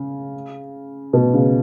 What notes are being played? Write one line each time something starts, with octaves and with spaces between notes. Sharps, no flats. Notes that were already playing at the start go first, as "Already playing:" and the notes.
Already playing: C#3
B2
C#3